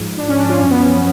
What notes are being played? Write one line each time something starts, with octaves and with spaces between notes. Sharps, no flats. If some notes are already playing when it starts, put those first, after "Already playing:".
Already playing: G#2 F3
D4
C#4
D4
F4
F#2 F3 C#4
B3
C#4